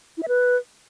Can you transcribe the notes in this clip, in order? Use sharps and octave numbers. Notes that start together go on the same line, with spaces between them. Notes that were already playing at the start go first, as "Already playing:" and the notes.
E4
E5
B4